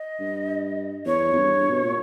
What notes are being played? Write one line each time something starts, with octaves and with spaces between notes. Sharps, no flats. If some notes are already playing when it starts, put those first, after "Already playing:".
Already playing: D#5
G2
E2 C#5
E2
G2
B2
A#2